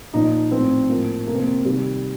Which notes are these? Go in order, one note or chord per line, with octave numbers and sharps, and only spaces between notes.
A#2 F3 D#4
A2 F3 C4
A2 F3 A#3
C3 F3 A#3 C4
A#3
C3 D#3 G3